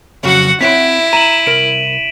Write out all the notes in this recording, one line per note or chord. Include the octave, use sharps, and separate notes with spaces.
F2 C#3 F#3 F#4 F#5
C4 E4 C#5 F#5 B6 D7
A#5 D#7 E7 F#7
C2 A#4 D7 F#7